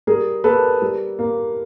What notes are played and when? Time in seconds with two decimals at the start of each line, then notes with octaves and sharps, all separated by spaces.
0.07 G3 G#4 A#4
0.44 A#3 A4 B4
0.82 G3
1.19 A#3